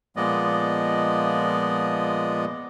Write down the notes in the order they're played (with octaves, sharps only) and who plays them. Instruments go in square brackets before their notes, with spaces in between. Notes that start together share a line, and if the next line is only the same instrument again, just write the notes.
[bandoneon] A#2 F3 G#3 B3 D5 D#5